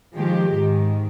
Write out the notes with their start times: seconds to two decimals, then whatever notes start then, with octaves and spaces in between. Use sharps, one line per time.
0.14 D#3 F3 G#3 G4
0.55 G#2 D#3